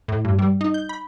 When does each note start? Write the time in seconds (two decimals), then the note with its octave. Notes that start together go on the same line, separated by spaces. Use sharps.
0.08 A2
0.25 G2
0.39 G3
0.61 D#4
0.74 G6
0.89 B5